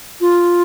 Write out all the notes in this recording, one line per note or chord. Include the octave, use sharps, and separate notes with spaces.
F4